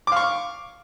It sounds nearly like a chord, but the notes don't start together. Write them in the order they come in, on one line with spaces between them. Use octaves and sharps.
D6 F5 C#6